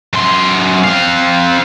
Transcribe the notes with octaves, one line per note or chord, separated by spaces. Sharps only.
F#2 C6
C4 F5